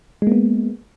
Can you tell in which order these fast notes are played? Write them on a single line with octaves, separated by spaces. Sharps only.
G#3 A#3 B3